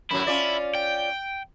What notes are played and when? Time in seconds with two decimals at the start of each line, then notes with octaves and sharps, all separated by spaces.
0.11 F#2 A2 F#3 E4
0.27 C#4 F4 D5
0.75 G5